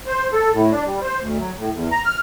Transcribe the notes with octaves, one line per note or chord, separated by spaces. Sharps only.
C5
A4
A2
D4
G3
C5
D2
F#3
A2
E2
A#5
F6